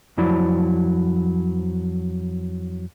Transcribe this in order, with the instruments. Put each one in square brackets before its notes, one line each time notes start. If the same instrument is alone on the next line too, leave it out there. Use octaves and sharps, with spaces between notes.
[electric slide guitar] F2 F3 F#3 E4 D5